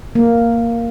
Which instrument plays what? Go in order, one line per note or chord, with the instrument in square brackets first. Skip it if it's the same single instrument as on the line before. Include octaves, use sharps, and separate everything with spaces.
[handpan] A#3